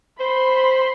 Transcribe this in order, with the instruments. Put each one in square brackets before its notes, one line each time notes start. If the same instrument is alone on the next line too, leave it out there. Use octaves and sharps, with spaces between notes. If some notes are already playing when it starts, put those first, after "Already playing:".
[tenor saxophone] C5 [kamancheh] B5 C6